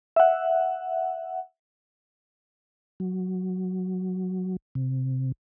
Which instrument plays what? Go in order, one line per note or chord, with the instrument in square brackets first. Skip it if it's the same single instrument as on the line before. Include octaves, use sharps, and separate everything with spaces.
[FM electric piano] E5 F#5
[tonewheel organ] F#3
C3